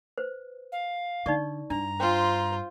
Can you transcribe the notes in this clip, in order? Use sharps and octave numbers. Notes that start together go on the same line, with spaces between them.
B4 C5
F5
D3 D#4 D5 C#6
G2 D4 A#5
F4 C5 G5